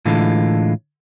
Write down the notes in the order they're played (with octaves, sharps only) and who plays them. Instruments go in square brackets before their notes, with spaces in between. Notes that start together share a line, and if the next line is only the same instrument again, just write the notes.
[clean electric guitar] A2 D3 E3 G#3 F4 A4